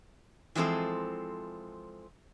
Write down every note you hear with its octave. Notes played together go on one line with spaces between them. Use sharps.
E3 F3 G#3 C4 A4